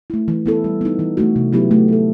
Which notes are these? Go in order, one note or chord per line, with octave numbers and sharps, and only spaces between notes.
A3 E4
E3
B3 E4 A4
G3
B3 D#4
E3
A3 D#4 F#4
C3
F#3 B3 E4 G4
A3
E4 A4